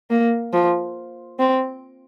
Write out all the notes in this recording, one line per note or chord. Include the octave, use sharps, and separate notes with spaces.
A#3
F3
C4